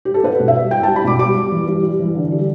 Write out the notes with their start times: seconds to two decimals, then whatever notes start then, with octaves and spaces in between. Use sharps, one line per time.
0.05 G4
0.14 A4
0.23 B3 B4
0.40 B2
0.48 E5
0.56 G3
0.71 E4 G5
0.83 A5
0.88 G3
0.96 B5
1.04 B2 D6
1.19 G3 D6
1.35 G3
1.52 E3
1.67 G3
1.83 G3
1.99 E3
2.15 D3
2.32 G3